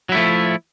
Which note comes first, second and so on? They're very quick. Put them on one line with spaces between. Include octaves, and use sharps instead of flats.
F#3 E4 A3 F3